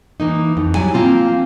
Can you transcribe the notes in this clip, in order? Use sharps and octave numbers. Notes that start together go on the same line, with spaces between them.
E3 A#3 D#4
F2
F#3 G3 E4 G#5
F3 G3 A#3 C4 F4